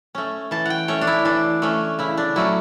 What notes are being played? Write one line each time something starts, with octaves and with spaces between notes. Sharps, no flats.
A3 C#4
E3 A5
F#5 G5
A3 C#4 C#5
D4
E4
E3 D4
A3 C#4
C#3 E4
D4
F#3 A3 C#4 E4